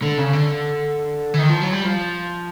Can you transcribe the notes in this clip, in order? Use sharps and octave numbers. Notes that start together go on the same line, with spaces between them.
D3
C#3
D3
E3
D#3
F3
F#3
G3
F3